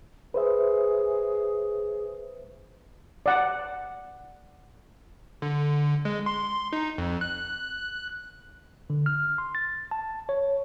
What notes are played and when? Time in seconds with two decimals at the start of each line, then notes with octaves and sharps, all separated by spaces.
0.34 G#4 B4 C5 E5
3.26 D5 F#5
5.42 D3
6.05 G#3
6.26 C6
6.73 D#4
6.98 F2
7.21 F#6
8.90 D3
9.06 F6
9.38 C6
9.55 A6
9.91 A5
10.29 C#5